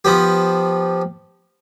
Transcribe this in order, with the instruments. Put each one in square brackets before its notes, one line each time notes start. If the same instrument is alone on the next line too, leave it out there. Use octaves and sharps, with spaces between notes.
[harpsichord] F3 B3 G4